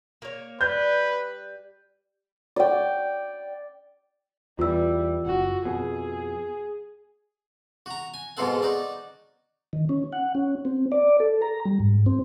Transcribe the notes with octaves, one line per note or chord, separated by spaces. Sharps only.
A#3 C#5
G3 B4 G6
D5 G5
E2 E3 G3 F4 E6
F#1 F#4
F2 B2 G#4
F#4 A#5
G#5
G#2 B2 B3 F4 A4 F#5
D#4 F#4 D5
D#3
C#4
F#5
C#4
C4
D5
A4
A#5
G3
G#2
C4